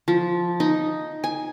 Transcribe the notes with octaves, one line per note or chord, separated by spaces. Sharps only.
F3
D#4
G#5